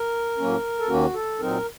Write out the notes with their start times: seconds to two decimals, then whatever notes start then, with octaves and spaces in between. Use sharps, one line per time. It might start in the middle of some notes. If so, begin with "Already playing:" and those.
Already playing: A#4
0.38 A2 F#3 A#3 C#4
0.79 A4
0.88 D#2 D#3 A#3 C#4 F#4
1.14 A4
1.39 A#2 F#3 C4 D#4 A#4